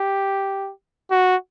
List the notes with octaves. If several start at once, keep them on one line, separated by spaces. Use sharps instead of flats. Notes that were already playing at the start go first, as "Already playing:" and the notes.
Already playing: G4
F#4